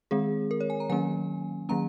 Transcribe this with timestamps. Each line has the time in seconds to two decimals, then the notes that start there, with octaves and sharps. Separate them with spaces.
0.11 D#3 G#3 C4 G#4
0.51 A#4
0.60 C#5
0.70 G#5
0.80 A#5
0.90 D#3 F#3 A#3 C#4 G#5
1.69 D#3 F#3 A#3 C#4 A#5